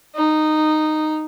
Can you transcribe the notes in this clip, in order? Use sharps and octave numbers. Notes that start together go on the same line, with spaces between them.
D#4